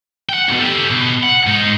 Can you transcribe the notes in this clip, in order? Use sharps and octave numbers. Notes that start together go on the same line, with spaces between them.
F#5 G5
D#2 B2
G4 A4
B2
F#5
G#2 D#4